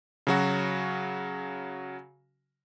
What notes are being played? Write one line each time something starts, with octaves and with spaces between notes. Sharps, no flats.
C#3 F#3 F#4